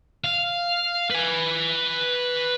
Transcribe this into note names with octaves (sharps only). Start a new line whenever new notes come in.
F5
B4 G#5